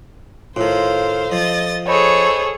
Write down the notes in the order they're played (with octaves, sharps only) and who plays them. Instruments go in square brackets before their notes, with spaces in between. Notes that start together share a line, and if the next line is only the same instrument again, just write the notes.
[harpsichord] A2 D#3 [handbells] F4 A4 [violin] C5 F5
[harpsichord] F3 [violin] D#5 A6
[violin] G#4 A4 [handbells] C5 D#5 B5 [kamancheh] C#5